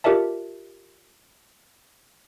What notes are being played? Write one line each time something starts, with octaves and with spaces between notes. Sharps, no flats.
F4 G4 A#4 D5 E5 A5